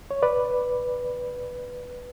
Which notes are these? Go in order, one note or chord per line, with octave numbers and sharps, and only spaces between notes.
C#5
B4 D5